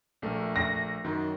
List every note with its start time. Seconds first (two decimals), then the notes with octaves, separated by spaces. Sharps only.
0.22 A#1 A3 A#4
0.56 A#6
1.04 F#2 D#3 F#3